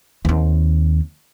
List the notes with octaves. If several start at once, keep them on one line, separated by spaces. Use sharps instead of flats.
D#2 C4